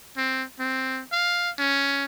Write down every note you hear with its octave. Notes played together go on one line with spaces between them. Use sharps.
C4
C4
F5
C#4